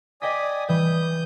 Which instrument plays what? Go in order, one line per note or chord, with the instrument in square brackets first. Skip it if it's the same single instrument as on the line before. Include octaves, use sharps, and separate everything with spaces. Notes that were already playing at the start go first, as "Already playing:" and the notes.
[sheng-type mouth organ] D5 G#5 D#6 [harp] D#5 G5 B6
[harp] E3 G3 [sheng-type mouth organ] D#6 G6